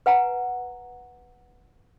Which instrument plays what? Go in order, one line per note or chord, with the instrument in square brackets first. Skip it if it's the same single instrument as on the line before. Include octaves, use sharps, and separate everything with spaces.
[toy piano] B4 F#5 G#5 A#5